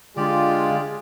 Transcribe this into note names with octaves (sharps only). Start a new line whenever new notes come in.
D3 G#3 D4 F4 G4 G#4 D5